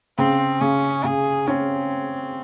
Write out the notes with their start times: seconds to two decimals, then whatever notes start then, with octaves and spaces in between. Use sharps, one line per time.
0.18 C#3 C4
0.61 C#3 C#4
1.04 C#3 G#4
1.48 C4 C#4